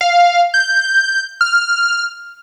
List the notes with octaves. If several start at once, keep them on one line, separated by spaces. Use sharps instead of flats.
F5
G6
F6